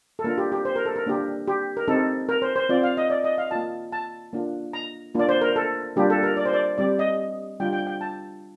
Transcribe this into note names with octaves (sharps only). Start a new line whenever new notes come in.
A4
A#3 D4 F4 A#4
G4
G4
C5
A#4
A4
A#4
A#3 D4 G4
G4
A#4
C4 D#4 G4 A4
A#4
C5
C5
C4 F4 D5
F5
D#5
D5
D#5
F5
A#3 F4 A5
A5
A#3 D4 F4
A#5
A#3 D4 F4 D5
C5
A#4
A4
G3 A#3 D4 F4 G4
A4
A#4
D5
C5
D5
G3 C4 G4 D5
D#5
G3 D4 F4 G5
G5
G5
A5